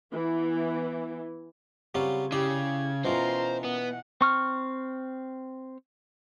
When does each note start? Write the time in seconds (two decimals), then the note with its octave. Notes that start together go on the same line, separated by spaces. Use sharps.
0.11 E3 B3
1.95 C#3 F#3 G3 C4 F4
2.32 C#3 E4 G4 D5 G#6
3.05 B2 E3 C#4 F4 A#4 C5 A#5
3.64 B3 F#5
4.21 C4 C#6 F6